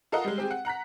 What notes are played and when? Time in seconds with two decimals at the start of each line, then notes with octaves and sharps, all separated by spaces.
0.12 F4 A4 A#4 D#5 F#5
0.25 G3 G#3
0.38 C4 G4 G#4
0.51 F#5
0.65 F#5 A#5 F#6 B6